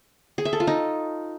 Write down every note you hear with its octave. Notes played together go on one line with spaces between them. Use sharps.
G#4
E5
A4
F4
D#4